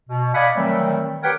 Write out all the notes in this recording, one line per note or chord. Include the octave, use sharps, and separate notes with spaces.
B2
D5 D#5 F5 F#5 G#5 B5
D#3 E3 F#3 G3 A3 C4
G4 A#4 B4 C#5 F#5 G5